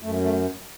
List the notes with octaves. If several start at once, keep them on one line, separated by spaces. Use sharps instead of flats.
F#2 A3
A3